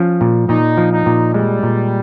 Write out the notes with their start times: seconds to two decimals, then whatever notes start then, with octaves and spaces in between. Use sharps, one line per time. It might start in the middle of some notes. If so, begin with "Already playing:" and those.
Already playing: F3 C#4
0.21 A#2
0.49 A#2 D#4
0.77 F3
0.92 D#4
1.06 A#2
1.34 G3 G#3
1.63 A#2